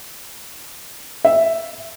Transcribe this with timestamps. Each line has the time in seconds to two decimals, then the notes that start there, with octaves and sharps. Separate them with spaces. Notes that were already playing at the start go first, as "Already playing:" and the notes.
1.25 E5